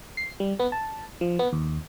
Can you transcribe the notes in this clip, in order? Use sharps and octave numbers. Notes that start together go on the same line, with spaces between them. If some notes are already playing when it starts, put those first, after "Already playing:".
C7
G3
B3
A5
F3
B3
D#2